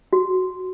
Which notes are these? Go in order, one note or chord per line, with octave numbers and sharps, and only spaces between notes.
F#4